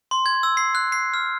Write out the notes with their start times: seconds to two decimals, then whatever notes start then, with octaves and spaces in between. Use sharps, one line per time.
0.11 C6
0.26 G#6
0.43 E6
0.57 C7
0.75 F#6
0.92 C7
1.14 F6